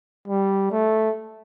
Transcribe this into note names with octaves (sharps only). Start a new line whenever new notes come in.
G3
A3